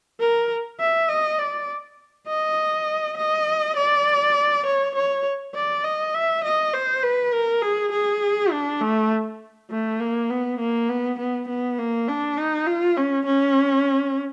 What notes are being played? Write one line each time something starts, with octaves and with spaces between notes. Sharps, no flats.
A#4
E5
D#5
D5
D#5
D#5
D5
C#5
C#5
D5
D#5
E5
D#5
C5
B4
A#4
G#4
G#4
D4
A3
A3
A#3
B3
A#3
B3
B3
B3
A#3
D4
D#4
F4
C#4
C#4